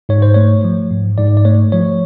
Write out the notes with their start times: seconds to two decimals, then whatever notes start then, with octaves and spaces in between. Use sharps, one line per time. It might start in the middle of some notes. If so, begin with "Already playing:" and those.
0.09 G#2 C#5
0.22 C5
0.34 A3 C#5
0.64 F3
0.91 G#2
1.18 G#2 D5
1.37 D5
1.45 A3 C#5
1.72 F3 C#5